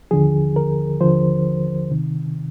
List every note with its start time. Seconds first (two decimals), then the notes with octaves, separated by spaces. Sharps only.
0.11 D#2 D3 F3 G#4
0.56 A#4
1.01 D#2 D3 F3 C5
1.91 C3 D#3